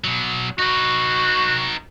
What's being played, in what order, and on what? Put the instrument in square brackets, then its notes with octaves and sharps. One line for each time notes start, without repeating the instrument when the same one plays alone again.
[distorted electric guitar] B2 F#3
[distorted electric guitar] D#4 B4 [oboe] F#4